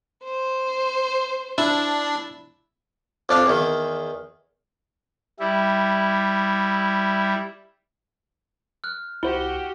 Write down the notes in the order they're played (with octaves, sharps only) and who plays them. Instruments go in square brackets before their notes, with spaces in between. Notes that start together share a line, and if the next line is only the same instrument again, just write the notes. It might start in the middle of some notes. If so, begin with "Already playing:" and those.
[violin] C5
[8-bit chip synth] D4 [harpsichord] E4
[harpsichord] F2 D4 F5
E2 D#3
[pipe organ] G3 E4
[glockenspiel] F6 F#6
[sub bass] C2 [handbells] E4 C5 [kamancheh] F#4 G4 [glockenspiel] G7